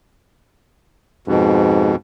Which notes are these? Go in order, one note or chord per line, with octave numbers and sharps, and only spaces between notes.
F2 G#2 B2